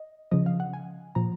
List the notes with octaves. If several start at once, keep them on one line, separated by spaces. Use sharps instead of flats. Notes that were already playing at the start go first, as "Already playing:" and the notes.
Already playing: D#5
C#3 F3 D#5
F5
F#5
G#5
A#2 F3 A#5